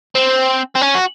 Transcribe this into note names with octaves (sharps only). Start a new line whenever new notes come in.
C4
C4
C#4
F#4